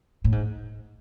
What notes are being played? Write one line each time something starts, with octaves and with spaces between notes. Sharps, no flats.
A2
G#2